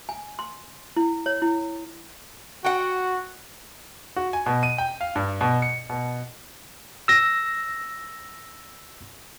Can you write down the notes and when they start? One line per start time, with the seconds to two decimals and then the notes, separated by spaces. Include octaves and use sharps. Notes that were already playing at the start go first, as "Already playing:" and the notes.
0.09 G#5
0.39 C6
0.97 E4
1.26 C#5
1.42 E4
2.64 F#4 F#5 G5
4.16 F#4
4.33 G#5
4.46 B2
4.63 D#7
4.78 G5
5.01 F5
5.16 G2
5.41 B2
5.62 C#7
5.90 B2
7.08 E6 A#6